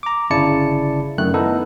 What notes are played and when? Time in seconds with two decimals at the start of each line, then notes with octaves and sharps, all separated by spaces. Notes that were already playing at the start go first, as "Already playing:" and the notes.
0.03 A#5 D6
0.30 G1 C#3 E4 D5 A5 C#7
1.18 F#2 D#3 A3 F#6
1.34 B3 D#4 E4 A4